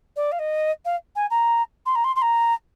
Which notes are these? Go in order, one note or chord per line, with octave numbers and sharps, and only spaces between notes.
D5
F5
D#5
F5
G#5
A#5
C6
A#5
C6
C6
A#5